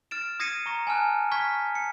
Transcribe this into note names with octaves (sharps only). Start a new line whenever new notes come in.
F6 A6 D7 E7
D#6 G#6 A#6 C7 C#7 D#7
A#5 C#6 A#6
G#5 A5 F6 F#6
C#6 F6 G#6 B6
C#7